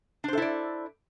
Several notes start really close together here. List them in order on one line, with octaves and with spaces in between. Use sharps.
D4 C5 A4 E4 D5